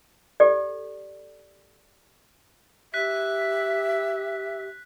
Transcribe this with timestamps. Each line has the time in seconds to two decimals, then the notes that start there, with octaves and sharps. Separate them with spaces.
0.40 G4 A4 D5
2.94 G4 E5 F#6 B6